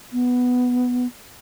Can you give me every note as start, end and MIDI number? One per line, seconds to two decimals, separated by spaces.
0.13 1.06 59